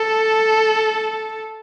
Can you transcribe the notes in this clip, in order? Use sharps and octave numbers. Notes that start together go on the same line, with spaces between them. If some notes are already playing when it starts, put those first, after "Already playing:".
Already playing: A4